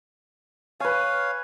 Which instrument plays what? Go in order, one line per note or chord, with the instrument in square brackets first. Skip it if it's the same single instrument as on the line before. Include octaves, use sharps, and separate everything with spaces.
[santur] B4 G#5 [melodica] C#5 F5